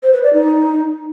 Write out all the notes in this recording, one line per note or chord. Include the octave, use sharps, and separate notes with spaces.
C5
B4
D5
D#4